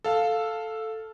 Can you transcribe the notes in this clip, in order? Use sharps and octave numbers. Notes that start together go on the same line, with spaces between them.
A4 F5